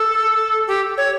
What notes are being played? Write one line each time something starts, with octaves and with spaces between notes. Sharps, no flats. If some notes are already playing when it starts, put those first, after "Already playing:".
Already playing: A4
G4
C#5